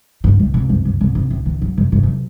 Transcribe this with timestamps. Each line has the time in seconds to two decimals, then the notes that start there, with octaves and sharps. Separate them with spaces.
0.24 C#2 G#2
0.40 C#2 A2
0.54 G#2 C3
0.69 C#2 F#2
0.85 C#2 F#2
1.00 G#2 C3
1.15 C#2 G#2
1.30 C#2 A2
1.46 A2 D#3
1.62 G#2 F#3
1.77 F#2 C3
1.92 G#2 C3
2.03 E2
2.08 F#3